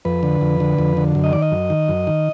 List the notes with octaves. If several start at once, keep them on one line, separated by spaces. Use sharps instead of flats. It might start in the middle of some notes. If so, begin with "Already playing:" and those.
F2 B4
D3
F2
D3
F2
D3
F#2
D#5
D#3 D5
D#5
F#2
D#3
F#2
D#3